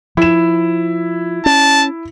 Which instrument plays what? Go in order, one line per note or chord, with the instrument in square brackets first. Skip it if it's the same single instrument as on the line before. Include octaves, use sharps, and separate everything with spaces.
[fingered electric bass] F3 [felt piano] E4 E7
[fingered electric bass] C#4 [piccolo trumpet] A5